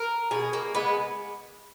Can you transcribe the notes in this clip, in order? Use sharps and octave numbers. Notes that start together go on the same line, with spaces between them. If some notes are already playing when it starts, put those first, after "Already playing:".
Already playing: A#4
B2 G#4
A#3
G#3 B3